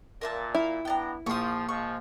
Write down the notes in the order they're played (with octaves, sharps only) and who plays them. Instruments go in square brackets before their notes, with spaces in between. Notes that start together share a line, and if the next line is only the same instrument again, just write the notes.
[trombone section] A#2 [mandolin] A#4 E5 A5
[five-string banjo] E4 [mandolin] F5
[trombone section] B3 D4 [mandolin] G5 A5 A#5
[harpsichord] A#1 C6 [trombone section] F3 [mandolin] C#6 D#6
[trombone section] F3 G#3 [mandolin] C#6